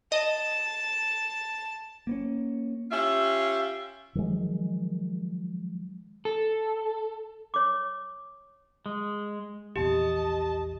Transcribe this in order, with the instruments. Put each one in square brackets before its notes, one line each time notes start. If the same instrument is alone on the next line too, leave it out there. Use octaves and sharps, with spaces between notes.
[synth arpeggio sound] D#5 [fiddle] A5
[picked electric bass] A#3 B3 C#4
[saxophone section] C#4 F4 G4 E5
[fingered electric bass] D#3 F3 F#3 G#3
[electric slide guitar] A4
[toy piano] C#5 D6
[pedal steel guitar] G#3
[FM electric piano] A#1 E2 C3 [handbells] G4 [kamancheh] D#5 A5